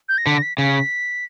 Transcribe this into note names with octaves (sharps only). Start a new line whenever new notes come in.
G6
A#6
D3 B6
A#6
B6
C#3 B6